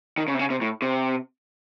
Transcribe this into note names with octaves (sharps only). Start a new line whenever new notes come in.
D#3
C#3
C3
C#3
C3
A2
C3